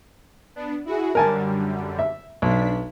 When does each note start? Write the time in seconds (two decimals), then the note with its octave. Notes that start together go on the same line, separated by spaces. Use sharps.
0.55 B3 D4
0.85 E4 F#4 G#4
1.15 F#2 D3 G3 A#4 G#5 A5
1.99 E5
2.42 B1 D4 B6